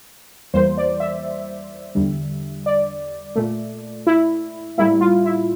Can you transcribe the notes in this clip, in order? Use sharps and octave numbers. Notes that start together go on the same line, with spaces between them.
E2 E3 G3 A#3 C5
D5
E5
E2 D3 G3
D5
A#2 A3
E4
A2 G3 A#3 E4
F4
E4